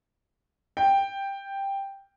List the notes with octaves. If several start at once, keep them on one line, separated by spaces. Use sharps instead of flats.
G5